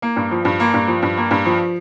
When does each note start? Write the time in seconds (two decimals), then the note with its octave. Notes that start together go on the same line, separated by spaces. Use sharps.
0.02 A#3
0.16 G2
0.31 F3
0.45 G2
0.60 A#3
0.74 G2
0.88 F3
1.02 G2
1.17 A#3
1.31 G2
1.46 F3